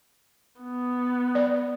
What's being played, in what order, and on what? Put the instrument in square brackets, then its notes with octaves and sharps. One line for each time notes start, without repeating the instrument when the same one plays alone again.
[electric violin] B3
[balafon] D5